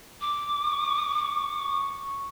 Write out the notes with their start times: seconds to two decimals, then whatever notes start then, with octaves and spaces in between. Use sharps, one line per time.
0.21 D6
0.65 C#6